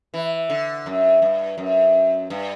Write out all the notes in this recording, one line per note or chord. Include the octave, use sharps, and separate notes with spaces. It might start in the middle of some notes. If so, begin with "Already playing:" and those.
E3
D3
F#2
G2
F#2
G2